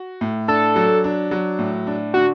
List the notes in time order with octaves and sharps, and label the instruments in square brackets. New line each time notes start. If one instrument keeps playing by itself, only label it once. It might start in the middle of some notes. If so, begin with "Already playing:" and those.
Already playing: [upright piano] F#4
A2
[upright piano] D4 [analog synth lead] A4
[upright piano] F#3
D4
F#3
A2
D4
[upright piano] D3 [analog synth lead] F#4